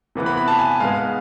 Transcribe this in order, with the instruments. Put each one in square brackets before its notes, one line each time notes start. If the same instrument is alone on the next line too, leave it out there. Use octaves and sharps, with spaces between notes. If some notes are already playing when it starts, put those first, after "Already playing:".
[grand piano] C3 E3 B3
B5
B5
A5
G#5
G#2 G#3 B3 F5